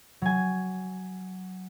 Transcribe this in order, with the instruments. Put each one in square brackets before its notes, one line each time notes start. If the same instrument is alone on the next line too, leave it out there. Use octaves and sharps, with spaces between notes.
[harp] F#3 G#5